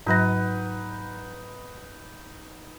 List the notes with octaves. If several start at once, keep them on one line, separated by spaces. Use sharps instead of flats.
G#2 F#3 D#4 B4 F#5 A#6